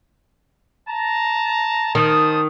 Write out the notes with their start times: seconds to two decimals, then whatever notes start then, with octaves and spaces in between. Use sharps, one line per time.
0.88 A5 A#5
1.95 D#3 C5 A5 D#6